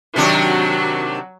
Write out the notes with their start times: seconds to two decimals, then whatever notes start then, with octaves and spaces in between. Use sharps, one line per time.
0.16 C3 D#3 F#3 D4 F#4